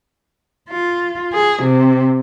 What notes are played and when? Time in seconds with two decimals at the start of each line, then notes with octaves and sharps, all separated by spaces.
0.70 F4
1.34 G#4
1.63 C3